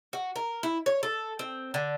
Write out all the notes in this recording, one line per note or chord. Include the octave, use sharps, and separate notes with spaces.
F#4
A#4
E4
C#5
A4
C4
D3